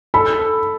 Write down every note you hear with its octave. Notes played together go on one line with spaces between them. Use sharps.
A4 B5
A4